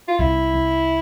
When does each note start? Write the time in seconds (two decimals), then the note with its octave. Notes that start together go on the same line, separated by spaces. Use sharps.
0.08 F4
0.18 C2 E4
0.53 C2